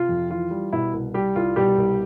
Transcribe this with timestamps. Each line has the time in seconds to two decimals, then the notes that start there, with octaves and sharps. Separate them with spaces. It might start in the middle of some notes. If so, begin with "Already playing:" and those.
Already playing: C3 F4
0.09 F2
0.30 E3 F4
0.51 G3
0.73 B2 E4
0.93 C2
1.14 G3 G4
1.36 C2 F4
1.56 B2 G3 G4
1.77 C2